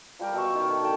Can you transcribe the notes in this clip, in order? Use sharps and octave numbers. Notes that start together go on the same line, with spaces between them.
F3 G3 G4 A#4
B2 E5 C#6
D#3
A4
D3 G5 A5